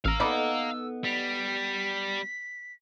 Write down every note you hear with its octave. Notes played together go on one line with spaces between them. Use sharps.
A1 F5 A#5 E6 F6
B3 D#4 A4 D5 B5 D6
G3 B6